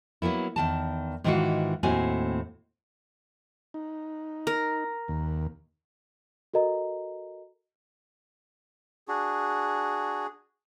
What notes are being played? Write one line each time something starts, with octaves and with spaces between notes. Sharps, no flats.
F#3 A#3 B3 E4
E2 D#3 A5
G#2 D#3 E3 D4 F4 F#4
D#2 A2 C4 F#4 G#5
D#4
A#4
D#2
F#4 A4 A#4 D#5 A#5
D4 F#4 G#4